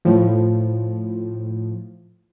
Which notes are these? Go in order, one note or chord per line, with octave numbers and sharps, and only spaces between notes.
A2 F3